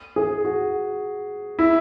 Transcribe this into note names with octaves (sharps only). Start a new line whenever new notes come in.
G#4
F#4
E4